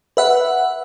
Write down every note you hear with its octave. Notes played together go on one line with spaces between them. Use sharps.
B4 E5 F#5